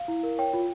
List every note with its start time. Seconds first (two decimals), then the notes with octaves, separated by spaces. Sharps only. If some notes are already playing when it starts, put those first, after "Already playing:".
Already playing: F5
0.08 E4
0.23 A#4
0.38 C#5 G5
0.53 F4